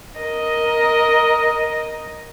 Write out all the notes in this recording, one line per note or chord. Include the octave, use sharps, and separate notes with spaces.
A#4 D#5